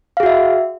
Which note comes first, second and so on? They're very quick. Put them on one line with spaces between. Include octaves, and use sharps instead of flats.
F5 G#4 F#4 E5